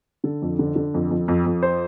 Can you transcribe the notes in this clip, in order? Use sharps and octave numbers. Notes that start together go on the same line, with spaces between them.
D3 A4
F2
D3
D3
F2
F2
F2
F2
C5